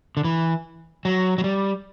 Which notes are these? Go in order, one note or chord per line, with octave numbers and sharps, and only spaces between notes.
D3
E3
F#3
F#3
G3